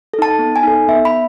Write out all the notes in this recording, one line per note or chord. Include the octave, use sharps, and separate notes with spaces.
A4
D#4 A5
B3
G#5
D#4 A4
B3 E5
B5